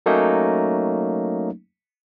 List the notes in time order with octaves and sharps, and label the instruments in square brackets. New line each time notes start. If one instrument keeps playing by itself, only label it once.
[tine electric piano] F#3 A3 A#3 C#4 D#4